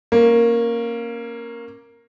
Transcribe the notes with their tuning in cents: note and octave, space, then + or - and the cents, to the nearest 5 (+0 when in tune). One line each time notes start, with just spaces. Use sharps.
A#3 +0 C#4 -15